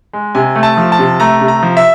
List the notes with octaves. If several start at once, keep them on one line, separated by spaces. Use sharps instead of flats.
G#3
C3 G#5
A3
A5
F3
A5
C3
A3 A#5
C3
A#5
F3
E5